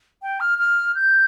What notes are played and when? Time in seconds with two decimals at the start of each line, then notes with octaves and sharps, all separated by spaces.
0.22 G5
0.40 F6
0.59 F6
0.95 G6